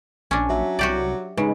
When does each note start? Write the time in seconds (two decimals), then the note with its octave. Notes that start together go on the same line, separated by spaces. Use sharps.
0.31 A#1 C#4 D4
0.50 F#3 E5
0.79 C2 F#4 G4 D5
1.37 C#3 G#3 D#4 B4